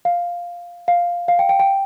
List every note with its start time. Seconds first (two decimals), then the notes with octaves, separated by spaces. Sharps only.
0.05 F5
0.88 F5
1.28 F5
1.39 G5
1.49 G5
1.60 G5